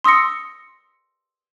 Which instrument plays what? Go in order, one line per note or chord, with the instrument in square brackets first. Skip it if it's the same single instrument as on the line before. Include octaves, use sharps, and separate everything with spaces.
[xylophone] C6 D#6 E6 A#6 C#7